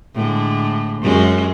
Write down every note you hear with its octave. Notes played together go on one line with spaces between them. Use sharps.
A2 D3 G#3
F#2 G#3 C#4